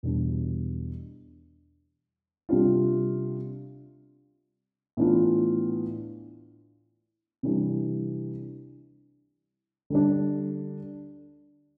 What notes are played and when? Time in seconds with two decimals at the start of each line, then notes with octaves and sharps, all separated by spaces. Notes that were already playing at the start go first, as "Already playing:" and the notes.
0.03 E2 B2 G3 D4
2.49 C3 G3 D4 F4
4.97 A2 E3 B3 D4 F4
7.43 C3 E3 G3 D4
9.90 D3 G3 D4